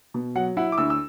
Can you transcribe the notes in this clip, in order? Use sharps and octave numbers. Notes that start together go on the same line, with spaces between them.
B2
F#3 F#5
E4 F#5
D6
D2 E6
E6